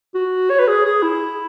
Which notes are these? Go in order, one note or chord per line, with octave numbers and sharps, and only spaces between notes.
F#4
C#5
B4
G#4
G#4
E4